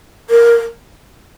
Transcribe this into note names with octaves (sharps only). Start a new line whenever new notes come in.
A#4